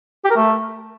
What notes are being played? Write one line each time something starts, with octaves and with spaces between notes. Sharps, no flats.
G4
A#4
A3